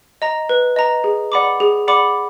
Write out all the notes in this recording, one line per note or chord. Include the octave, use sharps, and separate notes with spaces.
D#5 A#5
B4
D#5 A#5
G#4
D5 F#5 B5 D6
G#4
D5 F#5 B5 D6